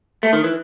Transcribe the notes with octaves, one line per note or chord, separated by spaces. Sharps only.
A3
D#3
E3